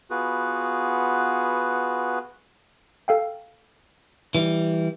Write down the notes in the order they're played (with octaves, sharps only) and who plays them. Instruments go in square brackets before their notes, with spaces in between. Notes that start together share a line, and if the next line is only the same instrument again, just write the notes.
[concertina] B3 F4 F#4 G#4 B4
[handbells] A4 F5 G5
[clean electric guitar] E3 G3